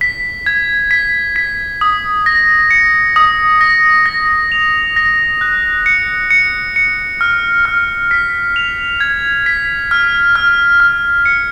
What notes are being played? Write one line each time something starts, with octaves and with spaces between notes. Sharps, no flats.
B6
G#6
B6
B6
D#6
A#6
C#7
D#6
A#6
A#6
F7
A#6
F#6
C#7
C#7
C#7
F6
F6
B6
F7
G#6
B6
F6
F6
F6
C#7